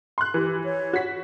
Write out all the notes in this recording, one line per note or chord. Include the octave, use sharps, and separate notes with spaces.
C6 F#6
E3 G4
C#5
F#4 B6